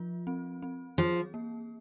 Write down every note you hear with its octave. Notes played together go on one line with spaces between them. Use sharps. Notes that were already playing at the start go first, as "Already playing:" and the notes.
Already playing: F3 F4
C4
C4
F3 G#4
A#3